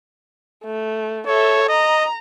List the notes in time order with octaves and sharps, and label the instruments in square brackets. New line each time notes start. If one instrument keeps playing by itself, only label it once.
[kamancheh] A3
[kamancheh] A4 E5 [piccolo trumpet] C#5
[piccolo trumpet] D#5 [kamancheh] A#5